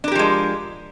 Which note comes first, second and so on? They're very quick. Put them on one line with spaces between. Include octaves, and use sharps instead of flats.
D4 A#4 G4 F3 G#3